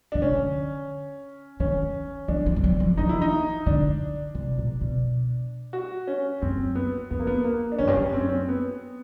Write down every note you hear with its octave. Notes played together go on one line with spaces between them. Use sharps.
C#3 D4
D3 C#4
D#3 C#4
E3 D4
F3
F3
F#3
F3
E3 D#4
E4
D#4
D3 D4
C3
A#2
B2
F#4
C#4
F#2 C4
B3
F2 B3
A#3
B3
A#3
D4
F#2 C#4
G2
F#2
C4
C#4
C4
B3